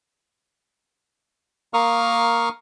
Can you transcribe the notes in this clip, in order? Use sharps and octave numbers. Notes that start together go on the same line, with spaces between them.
A#3 A#4 F5 C#6 D#6 F6